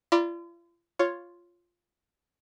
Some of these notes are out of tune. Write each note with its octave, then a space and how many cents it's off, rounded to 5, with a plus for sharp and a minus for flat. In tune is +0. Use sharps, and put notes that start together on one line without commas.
F4 -40 D5 +0 B5 -45
F4 +0 C#5 +0